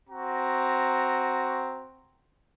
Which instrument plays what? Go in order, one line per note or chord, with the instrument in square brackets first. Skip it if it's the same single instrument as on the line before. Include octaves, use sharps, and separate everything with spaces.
[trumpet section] C4 F#4 A#5